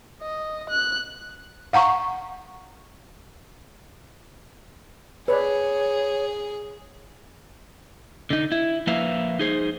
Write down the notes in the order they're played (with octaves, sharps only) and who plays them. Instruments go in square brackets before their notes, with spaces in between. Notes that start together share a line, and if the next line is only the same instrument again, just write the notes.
[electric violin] D#5
F#6
[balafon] F5 F#5 A#5 C#6
[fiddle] G#4 [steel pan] B4 D5 [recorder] C#5
[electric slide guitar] D3 D#4
E4
F3 A#3 B4 E5 F5
D#4 G#4 C5